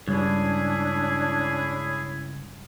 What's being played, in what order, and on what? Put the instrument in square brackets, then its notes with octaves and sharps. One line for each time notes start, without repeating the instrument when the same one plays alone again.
[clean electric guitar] C#2 [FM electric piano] G2 [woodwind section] C#4 E4 G#4 [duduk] D4